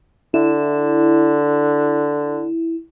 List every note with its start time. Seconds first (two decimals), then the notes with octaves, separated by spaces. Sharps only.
0.34 D3 E4